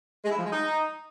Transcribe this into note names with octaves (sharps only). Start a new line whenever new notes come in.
G#3
E4
F3
G#3
D#4